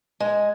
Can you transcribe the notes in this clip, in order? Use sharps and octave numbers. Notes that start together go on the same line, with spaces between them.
G#3